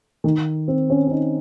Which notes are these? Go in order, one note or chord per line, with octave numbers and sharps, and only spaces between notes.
D#3
C4
C#4
C#4
D#4